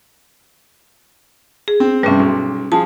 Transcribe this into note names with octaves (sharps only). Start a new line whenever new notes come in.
G#4
C4
G2 C3 G3 C#4
B1
F3 G#4 A5